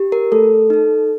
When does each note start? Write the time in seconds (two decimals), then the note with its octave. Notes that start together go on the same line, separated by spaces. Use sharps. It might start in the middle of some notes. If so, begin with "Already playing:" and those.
Already playing: G4
0.12 A#4
0.32 A3 A4
0.70 D#4 A4